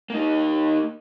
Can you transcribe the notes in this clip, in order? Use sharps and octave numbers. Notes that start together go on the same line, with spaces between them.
A#3 D#4